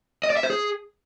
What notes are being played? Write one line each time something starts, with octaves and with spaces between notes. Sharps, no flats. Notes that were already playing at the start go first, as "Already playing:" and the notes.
D#5
D5
E5
C5
G#4